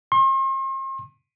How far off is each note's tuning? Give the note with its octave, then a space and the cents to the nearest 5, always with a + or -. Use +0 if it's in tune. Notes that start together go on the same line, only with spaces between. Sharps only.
C6 +40